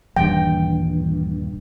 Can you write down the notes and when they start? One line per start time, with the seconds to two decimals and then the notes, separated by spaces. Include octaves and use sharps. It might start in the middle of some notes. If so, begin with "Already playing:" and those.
0.16 D#1 G2 E3 G5